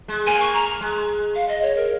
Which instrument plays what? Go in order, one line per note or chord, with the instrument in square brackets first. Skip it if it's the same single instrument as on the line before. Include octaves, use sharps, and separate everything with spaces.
[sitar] G#3
[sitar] A#3 [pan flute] G#5
[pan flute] C#6
A#5
[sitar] G#3
[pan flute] F5
D#5
C#5
A#4